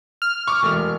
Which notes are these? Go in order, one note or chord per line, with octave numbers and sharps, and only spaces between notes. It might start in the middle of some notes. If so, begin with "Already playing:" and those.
F6
C#6 D6
E1 A3